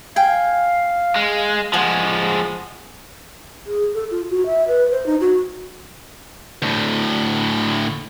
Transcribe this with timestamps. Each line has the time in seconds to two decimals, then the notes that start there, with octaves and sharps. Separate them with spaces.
0.16 F5 G5 G#5
1.16 G#3
1.73 F3 G#3 G#4 F#5 G#5
3.66 G#4
3.94 A4
4.11 F4
4.30 F#4
4.46 E5
4.68 B4
4.92 C5
5.06 D#4
5.20 F#4
6.62 D2 A2